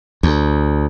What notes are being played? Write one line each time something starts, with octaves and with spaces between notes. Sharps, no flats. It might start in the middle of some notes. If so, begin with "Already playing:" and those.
D2